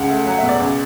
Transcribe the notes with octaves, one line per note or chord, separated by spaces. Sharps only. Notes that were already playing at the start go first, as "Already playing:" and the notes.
Already playing: C#2 F#5
A3
F#3 F#5
B2 E5
D5
C#2